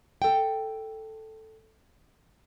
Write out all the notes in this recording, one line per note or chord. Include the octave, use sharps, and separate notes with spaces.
A4 G5